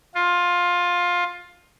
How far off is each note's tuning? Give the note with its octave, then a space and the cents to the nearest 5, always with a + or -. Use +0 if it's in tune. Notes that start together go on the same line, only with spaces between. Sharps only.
F4 +15